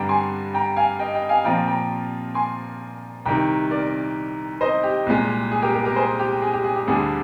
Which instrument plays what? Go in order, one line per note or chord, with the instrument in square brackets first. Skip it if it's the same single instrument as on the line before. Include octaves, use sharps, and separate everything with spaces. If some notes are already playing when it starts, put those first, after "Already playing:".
Already playing: [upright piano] G2 D3 G3 D4 G5 A#5
G#5 C6
G5 A#5
F5 G#5
D#5 G5
D#5 G5
F5 G#5
A#2 F3 C4 F4 G5 A#5
G5 A#5
G#5 C6
C2 C3 D#3 G5 A#5
A#4 D5
C5 D#5
G4
C2 A#2 G#3
G#4
G4 A#4
G4 A#4
G4 A#4
G#4 C5
G4
G#4
G4
G#4
G4
D2 D3 G3 D4 G#4